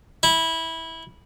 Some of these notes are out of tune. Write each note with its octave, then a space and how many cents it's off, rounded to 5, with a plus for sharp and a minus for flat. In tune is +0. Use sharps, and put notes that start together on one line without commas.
E4 -15